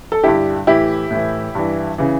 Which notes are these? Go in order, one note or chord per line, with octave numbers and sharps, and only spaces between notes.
A4
G2 D3 E4 G4
A2 E3 E4 G4
A2 E3
G2 E3
C#3 E3